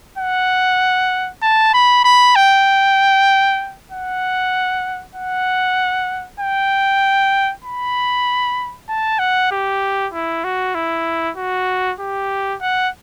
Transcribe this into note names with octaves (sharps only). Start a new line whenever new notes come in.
F#5
A5
B5
B5
G5
F#5
F#5
G5
B5
A5
F#5
G4
E4
F#4
E4
F#4
G4
F#5